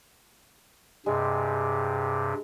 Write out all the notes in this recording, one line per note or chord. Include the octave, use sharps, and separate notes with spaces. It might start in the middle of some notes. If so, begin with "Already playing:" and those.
G2 C3 G#3